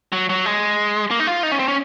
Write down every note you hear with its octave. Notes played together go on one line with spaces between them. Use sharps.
F#3
F#3
G#3
A#3
D#4
F4
D#4
C#4
C4
C#4